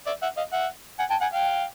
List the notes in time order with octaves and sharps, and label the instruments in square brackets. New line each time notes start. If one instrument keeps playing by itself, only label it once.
[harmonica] D5 E5
E5 F#5
D#5 F5
E5 F#5
F#5 G#5
G5 A5
F#5 G#5
F5 G5